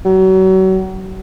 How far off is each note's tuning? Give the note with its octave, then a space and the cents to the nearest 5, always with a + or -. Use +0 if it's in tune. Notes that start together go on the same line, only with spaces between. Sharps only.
F#3 +35